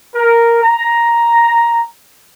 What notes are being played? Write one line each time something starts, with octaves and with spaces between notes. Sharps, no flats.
A#4
A#5